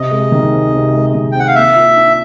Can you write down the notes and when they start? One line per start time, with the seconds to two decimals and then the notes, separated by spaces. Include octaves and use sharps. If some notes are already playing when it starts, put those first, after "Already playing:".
Already playing: C3 D#5
0.11 G#3
0.32 D#3
0.52 C4
0.73 C3
0.94 G#3
1.15 D#3
1.32 G5
1.35 C4 F#5
1.47 F5
1.55 A#3 E5
1.76 F4
1.96 D4